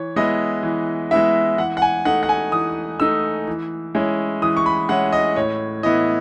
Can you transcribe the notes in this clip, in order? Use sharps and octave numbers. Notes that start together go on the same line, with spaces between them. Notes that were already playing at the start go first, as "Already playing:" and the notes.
Already playing: E3 C#5
G#3 B3 E4 D#5
E3
G#3 B3 E4 E5
E3 F#5
F#5
G#5
A3 D#4 F#5
F#5
G#5
E3 D#6
A3 D#4 E6
E3
G#3 C#4 E4
E3 D#6
C#6
B5
G#3 C#4 E4 F#5
D#5
A2 C#5
E3 B3 E4 D#5